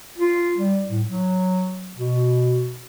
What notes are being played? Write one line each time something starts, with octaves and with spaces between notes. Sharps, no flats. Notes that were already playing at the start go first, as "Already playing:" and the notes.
F4
G3
A2
F#3
B2